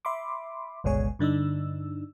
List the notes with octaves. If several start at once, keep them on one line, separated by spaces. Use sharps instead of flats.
E5 B5 C6 D6
G1 C#2 B2 G#3 C#5 G#5
G2 D3 D4 D#4 E6